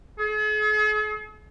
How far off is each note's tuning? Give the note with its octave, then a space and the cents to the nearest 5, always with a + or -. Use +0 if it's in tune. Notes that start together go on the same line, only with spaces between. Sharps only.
G#4 +45